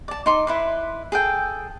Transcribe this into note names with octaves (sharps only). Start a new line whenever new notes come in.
D5 A5
D#4 C6 D6
E4 B4 C6
G#4 A4 G5